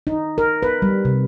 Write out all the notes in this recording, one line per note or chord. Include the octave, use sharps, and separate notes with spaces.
D#4
A#4
B4
G3
C3